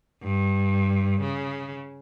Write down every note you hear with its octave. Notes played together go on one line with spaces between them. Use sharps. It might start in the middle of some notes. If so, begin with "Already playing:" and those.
G2
C#3